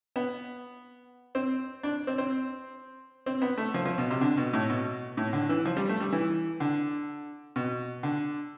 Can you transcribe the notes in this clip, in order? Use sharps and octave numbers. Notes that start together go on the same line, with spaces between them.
B3
C4
D4
C4
C4
C4
B3
A3
F3
F3
B2
C3
D3
B2
A2
B2
A2
D3
E3
F3
G3
A3
G3
E3
D3
B2
D3